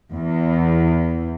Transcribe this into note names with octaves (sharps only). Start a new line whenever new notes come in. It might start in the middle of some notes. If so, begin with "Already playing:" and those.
E2